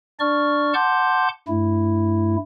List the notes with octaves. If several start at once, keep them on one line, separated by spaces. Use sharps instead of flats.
D4 D5 C#6 F6
F#5 A5 C6 D6 G6
G2 A3 E4